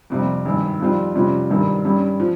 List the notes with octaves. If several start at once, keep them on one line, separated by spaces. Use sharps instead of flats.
F2 C3 G3
G#1 G2 D#3
F2 D#3 G3 C4 F4
F2 C3 G3 C#4 F4
G#1 G2 G3 A#3
G2 G3 C#4
F3